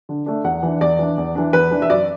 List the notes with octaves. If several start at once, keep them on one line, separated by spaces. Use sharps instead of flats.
D3
A3 D4
E2 F#5
E3 D4
E2 D5
E3 D4
E2
E3 D4
E2 B4
E3 D4
E5
F#2 D5